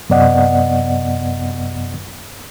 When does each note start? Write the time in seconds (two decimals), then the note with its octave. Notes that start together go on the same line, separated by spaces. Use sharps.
0.10 F#2 C3 B3 D5 D#5 F#5